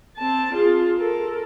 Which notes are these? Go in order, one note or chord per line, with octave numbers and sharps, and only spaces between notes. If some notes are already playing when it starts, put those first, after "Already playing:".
C4 A5
F4 G#4
A4 A#4